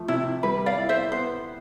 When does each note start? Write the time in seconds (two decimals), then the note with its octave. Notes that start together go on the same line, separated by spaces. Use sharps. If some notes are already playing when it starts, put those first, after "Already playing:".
Already playing: F3 A3
0.08 C3 E4
0.43 G3 B4
0.66 D5 F5
0.78 E4
0.89 C5 E5
1.12 B3 C5